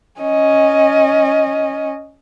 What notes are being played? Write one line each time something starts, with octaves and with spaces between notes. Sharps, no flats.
C#4 D#5